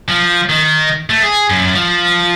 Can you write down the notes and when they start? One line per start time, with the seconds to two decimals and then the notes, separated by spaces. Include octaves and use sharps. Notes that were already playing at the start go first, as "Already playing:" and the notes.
0.09 F3
0.49 D#3
1.10 A3
1.22 G#4
1.50 F#2
1.75 F3